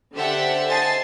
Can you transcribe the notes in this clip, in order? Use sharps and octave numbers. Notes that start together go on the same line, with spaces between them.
D3 G4 A4 C5 E5 F#5
C5 D#5 G#5 A5 A6 C7